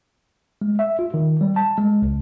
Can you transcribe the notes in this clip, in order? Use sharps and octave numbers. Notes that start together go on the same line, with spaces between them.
G#3
E5
F4
D#3
G3
A5
G#3
C#2